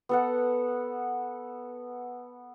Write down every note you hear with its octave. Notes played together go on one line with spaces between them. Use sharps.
B3 A4 F#5